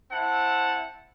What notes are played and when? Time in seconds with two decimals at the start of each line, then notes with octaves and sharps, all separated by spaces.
0.11 C4 E4 F#5 A5